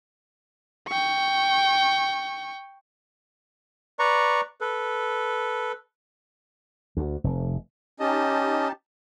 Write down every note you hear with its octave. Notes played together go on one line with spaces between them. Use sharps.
G5 C#6
B4 D5 A#5 C#6
A4 B4
D2
F1
C#4 D#4 G4 D#5 A5